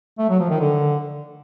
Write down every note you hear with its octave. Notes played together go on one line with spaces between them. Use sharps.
A3
F#3
F3
D#3
D3